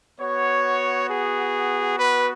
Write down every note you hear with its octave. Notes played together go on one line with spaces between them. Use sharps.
B3 F#4 C#5
G#4
B4